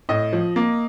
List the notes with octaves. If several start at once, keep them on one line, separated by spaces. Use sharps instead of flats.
A2 D#5
F3
A#3